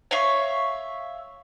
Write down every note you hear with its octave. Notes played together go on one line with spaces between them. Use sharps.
C#5 E5 F5 C#6